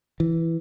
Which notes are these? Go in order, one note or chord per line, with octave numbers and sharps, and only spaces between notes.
E3